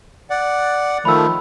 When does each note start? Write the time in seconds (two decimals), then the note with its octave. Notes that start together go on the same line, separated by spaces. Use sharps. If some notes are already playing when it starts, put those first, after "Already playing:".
0.30 D5 F#5
1.05 D#3 F3 A3 B5 E6